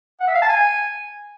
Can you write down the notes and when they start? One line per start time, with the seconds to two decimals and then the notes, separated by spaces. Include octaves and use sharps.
0.20 F#5
0.27 E5
0.35 F5
0.42 A5
0.49 G#5